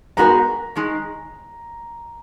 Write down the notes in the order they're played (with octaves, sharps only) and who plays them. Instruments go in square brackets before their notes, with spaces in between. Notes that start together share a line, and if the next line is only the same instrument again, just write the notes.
[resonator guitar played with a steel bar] G#3 B3 D#4 F#4 A#4 [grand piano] A#5
[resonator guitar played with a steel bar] D#3 G#3 D#4